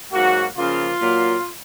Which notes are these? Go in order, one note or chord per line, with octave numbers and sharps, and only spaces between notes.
G#2 F#3 A#3 F#4
C#3 F3 A#3 F4
A#2 F#3 A#3